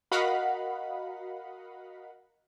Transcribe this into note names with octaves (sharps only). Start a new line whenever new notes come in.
F#4 A#4 D#5 F5 F#5 B5